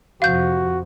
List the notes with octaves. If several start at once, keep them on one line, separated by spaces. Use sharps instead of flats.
F2 C3 F3 F#4 F5 G6